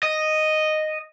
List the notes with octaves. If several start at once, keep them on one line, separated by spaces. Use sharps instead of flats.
D#5